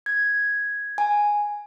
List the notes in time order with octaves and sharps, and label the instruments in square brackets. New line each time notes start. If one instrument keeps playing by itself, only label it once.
[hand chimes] G#6
G#5